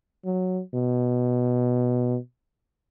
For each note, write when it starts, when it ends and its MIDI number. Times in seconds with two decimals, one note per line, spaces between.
0.25 0.61 54
0.74 2.17 47